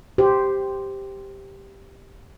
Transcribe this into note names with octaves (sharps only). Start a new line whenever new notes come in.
G4 C5